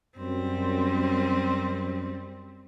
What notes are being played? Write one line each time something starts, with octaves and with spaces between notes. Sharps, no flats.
F#2 G3 C4